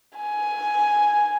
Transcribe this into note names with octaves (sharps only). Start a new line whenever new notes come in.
G#5